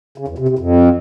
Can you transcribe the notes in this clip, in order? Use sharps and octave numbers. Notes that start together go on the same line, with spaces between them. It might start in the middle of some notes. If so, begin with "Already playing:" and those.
C#3
E2
C3
C3
F2